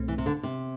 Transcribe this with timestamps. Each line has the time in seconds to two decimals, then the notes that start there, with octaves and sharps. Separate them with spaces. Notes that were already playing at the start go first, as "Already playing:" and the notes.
Already playing: C2 B2 A3 C4
0.08 E3
0.18 C3
0.26 D3
0.43 C3